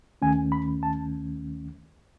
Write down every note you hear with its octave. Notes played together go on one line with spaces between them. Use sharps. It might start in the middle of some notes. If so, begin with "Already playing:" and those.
D#2 D#3 A3 C#4 G#5
B5
A5